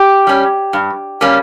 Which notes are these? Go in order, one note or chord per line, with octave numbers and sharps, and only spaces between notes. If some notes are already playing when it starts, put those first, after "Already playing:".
Already playing: G4
G3 C#4
G2
G3 A#3 C#4